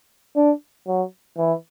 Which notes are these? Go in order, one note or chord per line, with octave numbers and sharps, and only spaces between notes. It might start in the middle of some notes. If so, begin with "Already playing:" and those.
D4
F#3
E3